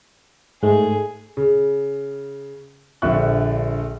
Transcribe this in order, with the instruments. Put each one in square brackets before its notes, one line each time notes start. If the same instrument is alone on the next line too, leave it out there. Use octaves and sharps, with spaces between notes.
[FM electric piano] G#2 G#3 A3 [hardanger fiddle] G#4
[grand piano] C#3
A#1 D3 F3 E5 C#6 F#6